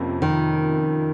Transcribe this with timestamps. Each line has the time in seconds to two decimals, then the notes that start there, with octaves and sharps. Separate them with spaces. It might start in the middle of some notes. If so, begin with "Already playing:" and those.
Already playing: F2 C3 A#3 C#4
0.22 D#3